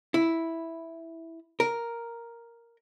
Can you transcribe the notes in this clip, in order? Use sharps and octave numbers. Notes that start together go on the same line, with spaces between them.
E4
A#4